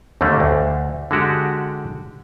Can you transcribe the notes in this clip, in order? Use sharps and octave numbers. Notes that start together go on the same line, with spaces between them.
D#2 D3 G3 A3 A#3
D2
D3 G#3 F#4 G4